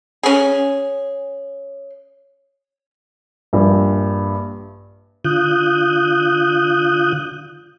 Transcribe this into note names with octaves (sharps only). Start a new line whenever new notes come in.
C#4 G#4
A#1 G2
D3 F4 D#6 F#6 G6